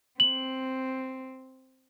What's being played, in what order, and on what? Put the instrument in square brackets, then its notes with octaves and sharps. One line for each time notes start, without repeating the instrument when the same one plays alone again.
[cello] C4 [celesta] F#7